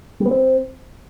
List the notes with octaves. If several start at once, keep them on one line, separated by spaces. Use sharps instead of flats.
G3
B3
C4